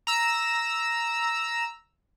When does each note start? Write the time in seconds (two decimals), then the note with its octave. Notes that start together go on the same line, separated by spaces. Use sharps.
0.07 A#5 E6